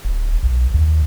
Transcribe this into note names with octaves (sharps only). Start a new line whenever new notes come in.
D1
B1
D#2